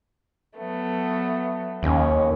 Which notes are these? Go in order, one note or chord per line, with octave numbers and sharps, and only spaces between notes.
F#3 A3 B3
D#2 C#4